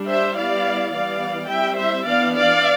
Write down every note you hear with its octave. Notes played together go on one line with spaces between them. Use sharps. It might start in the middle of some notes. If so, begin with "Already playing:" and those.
Already playing: G3 D4
C5 E5
G3 B3 E4 D5 F5
E3 G3 B3 D5 F5
G3 C4 E4 E5 G5
C5 E5
E3 B3 D4 D5 F5
D5 F5